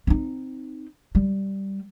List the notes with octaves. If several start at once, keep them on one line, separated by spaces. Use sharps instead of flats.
C4 D#4
G3